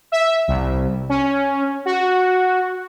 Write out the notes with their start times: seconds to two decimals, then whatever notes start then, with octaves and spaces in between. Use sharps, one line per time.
0.12 E5
0.48 C2
1.09 C#4
1.86 F#4